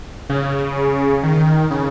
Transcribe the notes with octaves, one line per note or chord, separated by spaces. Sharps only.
C#3
D#3
C#3